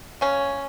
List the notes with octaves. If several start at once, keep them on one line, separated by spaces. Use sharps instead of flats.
C#3 C#4